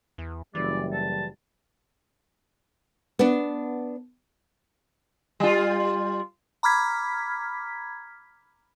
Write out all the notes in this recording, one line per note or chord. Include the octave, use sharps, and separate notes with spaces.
E2
F#1 E3 G3 D5
A5
B3 D4
G3 F4
A#5 B5 D6 F6 G#6 B6